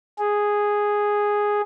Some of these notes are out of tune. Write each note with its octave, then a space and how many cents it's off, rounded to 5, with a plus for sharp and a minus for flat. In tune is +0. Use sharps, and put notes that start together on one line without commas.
G#4 -5